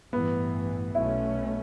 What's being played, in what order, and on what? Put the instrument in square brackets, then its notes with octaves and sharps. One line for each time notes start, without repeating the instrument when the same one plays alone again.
[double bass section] A1 G2 E3 [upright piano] B3
[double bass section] B1 B2 A3 C#4 [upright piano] E4